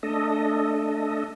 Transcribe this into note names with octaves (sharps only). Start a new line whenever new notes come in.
A3 D4 A4 D#5